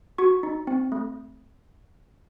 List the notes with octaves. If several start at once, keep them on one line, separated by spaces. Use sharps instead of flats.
F#4 C#6
D#4
C4
A3